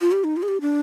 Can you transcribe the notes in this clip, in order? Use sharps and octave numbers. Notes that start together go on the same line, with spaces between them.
F4
G4
D#4
F4
G#4
G4
D4